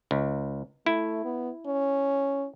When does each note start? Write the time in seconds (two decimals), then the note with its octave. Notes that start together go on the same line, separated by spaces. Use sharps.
0.11 C#2
0.86 A3 E4
1.25 B3
1.66 C#4